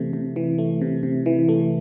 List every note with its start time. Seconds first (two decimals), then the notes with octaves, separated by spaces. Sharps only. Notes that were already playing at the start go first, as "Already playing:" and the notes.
Already playing: C3 E3 A3
0.13 C3
0.36 E3
0.58 A3
0.82 C3
1.03 C3
1.26 E3
1.49 A3